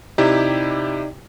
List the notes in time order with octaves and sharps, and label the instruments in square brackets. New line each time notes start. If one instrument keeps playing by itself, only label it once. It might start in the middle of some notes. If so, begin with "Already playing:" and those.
[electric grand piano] C3 E4 G4 [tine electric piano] D#4 D5 G#6